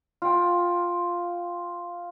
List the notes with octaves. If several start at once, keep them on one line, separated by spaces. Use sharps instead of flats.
F4 G5